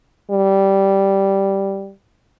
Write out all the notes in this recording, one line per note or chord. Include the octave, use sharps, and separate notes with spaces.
G3